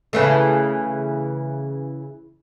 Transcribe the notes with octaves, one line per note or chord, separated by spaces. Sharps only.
C#3 E3 A3